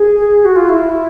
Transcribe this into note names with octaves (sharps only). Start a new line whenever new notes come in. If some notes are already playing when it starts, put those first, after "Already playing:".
Already playing: G#4
F#4
F4
E4